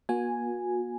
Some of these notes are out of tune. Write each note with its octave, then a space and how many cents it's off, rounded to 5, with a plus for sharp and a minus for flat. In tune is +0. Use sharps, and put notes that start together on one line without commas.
A#3 +45 F#4 -35 G#5 +0